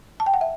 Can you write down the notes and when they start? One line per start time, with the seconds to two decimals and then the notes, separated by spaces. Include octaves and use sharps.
0.20 A5
0.26 G5
0.34 F#5
0.41 E5